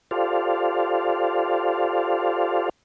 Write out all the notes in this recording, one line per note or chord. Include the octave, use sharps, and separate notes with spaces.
F4 G4 A4 C5 D5 F5